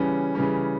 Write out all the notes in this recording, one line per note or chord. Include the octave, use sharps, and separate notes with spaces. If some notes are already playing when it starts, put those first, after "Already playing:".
Already playing: C#3 E3 G3 C#4
C#3 E3 G3 C#4